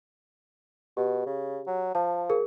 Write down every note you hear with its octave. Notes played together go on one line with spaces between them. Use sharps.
B2 G4
C#3
F#3
F3 A5
G#4 A#4